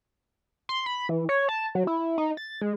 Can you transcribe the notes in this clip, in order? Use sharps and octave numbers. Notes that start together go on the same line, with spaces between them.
C6
B5
E3
C#5
A5
F#3
E4
D#4
A6
G#3